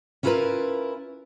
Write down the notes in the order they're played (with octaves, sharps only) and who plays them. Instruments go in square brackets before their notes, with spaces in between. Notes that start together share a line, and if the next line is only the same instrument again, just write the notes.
[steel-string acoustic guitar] C#4 E4 F4 G#4 A#4 B4